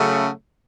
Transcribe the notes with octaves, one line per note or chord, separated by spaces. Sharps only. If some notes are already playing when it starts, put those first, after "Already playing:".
Already playing: C#3 F#3 A3